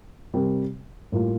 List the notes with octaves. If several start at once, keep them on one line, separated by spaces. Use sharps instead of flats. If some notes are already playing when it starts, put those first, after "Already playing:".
C3 G3 C4 G4 A#4
A2 G3 A#3 F4